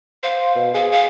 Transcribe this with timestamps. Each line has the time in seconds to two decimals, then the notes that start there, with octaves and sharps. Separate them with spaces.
0.23 C5 F5
0.55 B2
0.74 G#4 F5
0.92 F5